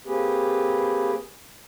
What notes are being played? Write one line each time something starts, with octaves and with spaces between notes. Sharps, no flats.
A#3 C4 G4 G#4 B4